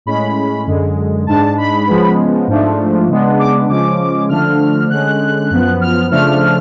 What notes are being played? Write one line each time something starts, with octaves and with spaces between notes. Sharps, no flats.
A2 G#3 C#4 B5
F#2 D3 G#3
G#2 G#3 D4 A5
B5
C#3 F3 G#3 B3
G#2 F3 A3 D4
C#3 G#3 B3 D4
D6
C#3 F3 G#3 C#4 D6
D3 F3 A3 D4 F6
D3 G#3 C#4 F#6
F#2 F3 B3
F6
C#3 F3 A3 D4 F6